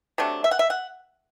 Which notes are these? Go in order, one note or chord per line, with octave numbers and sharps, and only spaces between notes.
C3 F#3 A3 D4
E5
F#5
E5
F#5